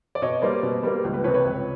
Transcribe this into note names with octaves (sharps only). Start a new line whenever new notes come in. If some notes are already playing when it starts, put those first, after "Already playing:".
D5
B2 C#5 D#5
G3 A#3 C5 D5
B2
G3 A#3
C#2
B4
C3 F3 B4 C#5
B4 C#5
C#2